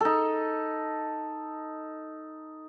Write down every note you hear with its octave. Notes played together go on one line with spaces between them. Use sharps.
D#4 A4